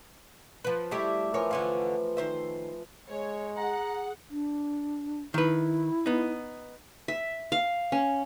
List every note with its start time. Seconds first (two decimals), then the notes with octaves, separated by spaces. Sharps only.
0.64 F3 B4
0.91 G3 A3 E4 G4 E5 D6
1.34 E2 E3 F3 A#4 C#5
1.51 D3 C#4 F4
2.17 D#3 C5 E5
3.10 G#3 C#5
3.57 G#4 F#5 A#5
4.30 D4
5.34 D#3 E4 B4
6.06 B3 D#4
7.08 E5
7.52 F5
7.92 C#4